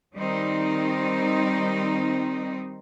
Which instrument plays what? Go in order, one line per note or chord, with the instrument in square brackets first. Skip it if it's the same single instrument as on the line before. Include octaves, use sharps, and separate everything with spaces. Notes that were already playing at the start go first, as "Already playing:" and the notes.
[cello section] D#3 G3 C4 D#4